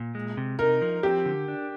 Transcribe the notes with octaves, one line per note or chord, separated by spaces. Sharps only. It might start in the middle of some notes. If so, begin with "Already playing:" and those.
Already playing: A#2
G#3
C3
D#4 A#4
F3
C4 G4
D3
D4